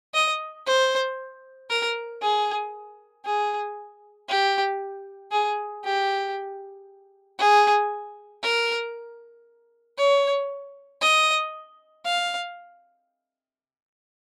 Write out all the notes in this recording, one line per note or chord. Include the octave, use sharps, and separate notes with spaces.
D#5
C5
A#4
G#4
G#4
G4
G#4
G4
G#4
A#4
C#5
D#5
F5